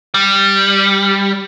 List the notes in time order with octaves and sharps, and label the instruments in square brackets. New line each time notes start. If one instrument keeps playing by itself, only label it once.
[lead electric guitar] G3